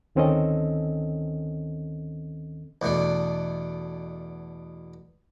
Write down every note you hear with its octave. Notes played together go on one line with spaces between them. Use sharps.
D2 D#3 C4 C#4 A4 D#5
E2 B2 A3 D4